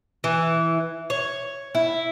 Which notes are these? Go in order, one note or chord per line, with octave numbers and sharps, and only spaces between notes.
E3
C#5
E4